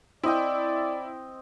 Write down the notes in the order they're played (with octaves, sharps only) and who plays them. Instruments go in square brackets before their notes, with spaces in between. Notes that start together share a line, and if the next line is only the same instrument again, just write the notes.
[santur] C4 D#5 G5 [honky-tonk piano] E4 [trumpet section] D5